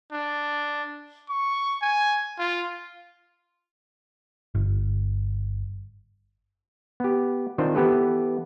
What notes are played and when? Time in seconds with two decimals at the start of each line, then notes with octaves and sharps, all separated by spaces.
0.12 D4
1.29 C#6
1.82 G#5
2.39 F4
4.55 G1
7.00 B3 G4
7.58 D#3 C4 D4 F4 C5
7.75 E3 B3 G4 A4 B4